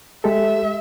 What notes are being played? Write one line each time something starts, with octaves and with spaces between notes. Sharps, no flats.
G#3 G4 A4 E5